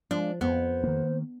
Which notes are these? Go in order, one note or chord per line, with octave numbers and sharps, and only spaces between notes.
F3 G#3 D4
F2 B3 C5
D#3 A#3